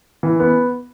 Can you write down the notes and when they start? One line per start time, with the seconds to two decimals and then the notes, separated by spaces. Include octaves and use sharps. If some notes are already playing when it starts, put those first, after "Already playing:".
0.23 E3
0.40 B3